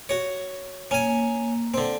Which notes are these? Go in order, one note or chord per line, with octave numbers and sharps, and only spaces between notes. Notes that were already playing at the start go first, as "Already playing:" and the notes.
F#4 C#5
A#3 C#4 G#5
D3 C4